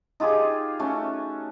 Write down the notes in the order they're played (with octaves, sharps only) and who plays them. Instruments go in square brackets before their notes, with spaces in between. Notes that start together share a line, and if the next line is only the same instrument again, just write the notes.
[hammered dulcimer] D#4 F4 G4 G#4
A3 C#4 F#4